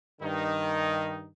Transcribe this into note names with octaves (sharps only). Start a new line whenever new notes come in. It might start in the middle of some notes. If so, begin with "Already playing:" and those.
G2 D#3 D#4